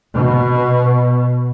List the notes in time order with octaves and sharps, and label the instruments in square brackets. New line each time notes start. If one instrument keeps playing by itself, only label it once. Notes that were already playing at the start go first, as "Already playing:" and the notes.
[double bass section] B2